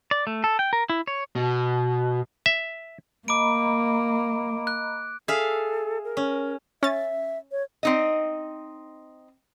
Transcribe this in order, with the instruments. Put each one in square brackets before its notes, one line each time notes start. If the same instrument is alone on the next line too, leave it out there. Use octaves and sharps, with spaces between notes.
[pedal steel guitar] D5
A3
A4
G5
A#4
E4
C#5
[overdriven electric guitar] B2
[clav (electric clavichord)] E5
[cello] A#3 [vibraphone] D#5 A#5 B5 [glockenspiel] D6 D7
[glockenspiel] F#6
[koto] G#4 E5 F5 [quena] A4
[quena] A#4
[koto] C#4
[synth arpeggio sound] C#4 A6 [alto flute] E5
[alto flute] C#5
[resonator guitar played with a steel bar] C4 D#4 D#5